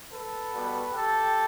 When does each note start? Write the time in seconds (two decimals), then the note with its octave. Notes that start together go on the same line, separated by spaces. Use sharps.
0.12 A4 B4
0.52 B2 G3 B3
0.92 G4 A4